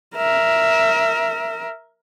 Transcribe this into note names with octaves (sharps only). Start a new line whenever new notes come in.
A#4 E5